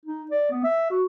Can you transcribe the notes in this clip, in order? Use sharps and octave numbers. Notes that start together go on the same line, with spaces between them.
D#4
D5
B3
E5
F#4